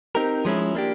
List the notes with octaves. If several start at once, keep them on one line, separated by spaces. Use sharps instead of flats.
C4 D#4 G4 A#4
F3 G#3 C#4 E4
A#3 D4 G4